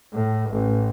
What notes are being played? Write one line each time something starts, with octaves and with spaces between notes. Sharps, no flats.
A2
A1